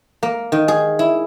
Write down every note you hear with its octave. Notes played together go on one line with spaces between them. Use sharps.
A#3
D#3
G#4
E4